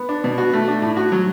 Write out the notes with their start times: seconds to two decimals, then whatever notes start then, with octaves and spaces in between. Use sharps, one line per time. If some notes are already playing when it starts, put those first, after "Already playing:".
Already playing: B3
0.09 D4
0.24 B2
0.38 F#4
0.53 A3
0.68 D4
0.82 A2
0.97 F#4
1.12 F#3